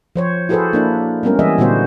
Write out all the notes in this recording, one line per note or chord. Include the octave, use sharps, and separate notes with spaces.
F3 C5 C#5
E4 F#4 G#4 A4 B4 C5
A#3 D4 E4
G3 G#3 B3 C#4 A#4
E3 G3 G#4 D#5 E5
A#2 D3 G3 B3 F#4 C5